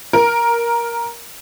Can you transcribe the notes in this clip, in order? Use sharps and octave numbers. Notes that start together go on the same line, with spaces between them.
A#4